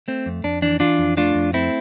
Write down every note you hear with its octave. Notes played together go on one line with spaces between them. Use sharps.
A3 C4
F2
F2 D4
E3 D4
E3 D4 F4
F2
A3 D4 F4
F2
A3 C4 E4